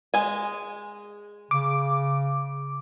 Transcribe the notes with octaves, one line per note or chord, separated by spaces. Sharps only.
G#3 G#5
C#3 D6